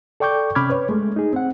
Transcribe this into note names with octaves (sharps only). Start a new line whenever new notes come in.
A4 D5 G5 C#6 D6 G6
C3 C#4 B5 D6 F6 G#6
B4 C#5
G#3 A3
D#4 G#4
C4 F#5